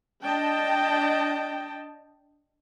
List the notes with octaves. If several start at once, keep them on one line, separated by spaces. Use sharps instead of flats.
D4 D#5 G5 A5